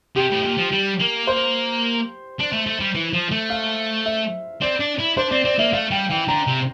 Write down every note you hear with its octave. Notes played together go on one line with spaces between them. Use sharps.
C3 G4
A2
A#2
F3
G3
A#3
C5
D4
A3
A3
G3
E3
F3
A3
F5
E5
C4 D5
D4
E4
D4 C5
C4 D5
C4 D5
A#3 E5
A3 F5
G3 G5
E3 G5
D3 A#5
C3